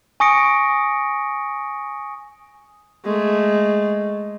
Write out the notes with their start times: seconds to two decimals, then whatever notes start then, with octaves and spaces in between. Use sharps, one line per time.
0.20 G#5 C#6 D#6 A#6 C#7 D7
3.05 G#3 A3